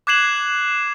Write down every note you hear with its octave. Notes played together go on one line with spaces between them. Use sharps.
D6 F#6 G#6 C7 E7 F#7